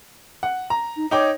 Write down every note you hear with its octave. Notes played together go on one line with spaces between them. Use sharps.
F#5
A#5
D#4
D#4 C#5 G5 D6